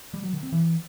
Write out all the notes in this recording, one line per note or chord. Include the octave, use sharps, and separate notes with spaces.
G3
F#3
D3
C4
E3